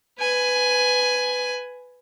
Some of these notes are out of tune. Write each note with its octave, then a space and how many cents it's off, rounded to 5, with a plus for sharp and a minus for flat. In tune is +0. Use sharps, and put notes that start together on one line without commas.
B4 +10 G#5 +5